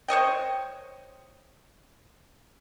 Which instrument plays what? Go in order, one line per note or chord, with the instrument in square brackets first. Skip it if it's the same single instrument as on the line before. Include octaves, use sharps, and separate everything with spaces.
[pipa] C5 C#5 D#5 G5